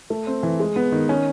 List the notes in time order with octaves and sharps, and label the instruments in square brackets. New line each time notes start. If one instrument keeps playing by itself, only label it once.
[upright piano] A3
C4
E3
G#3
B3
D#3
C#4